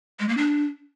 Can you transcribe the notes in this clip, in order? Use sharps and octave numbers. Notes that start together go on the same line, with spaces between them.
G#3
A#3
D4